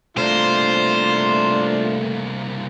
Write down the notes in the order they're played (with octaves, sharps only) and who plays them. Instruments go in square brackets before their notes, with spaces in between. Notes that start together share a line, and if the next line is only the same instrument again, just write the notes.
[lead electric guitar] C2 A#3 [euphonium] A3 [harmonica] D4 F4 [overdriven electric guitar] C5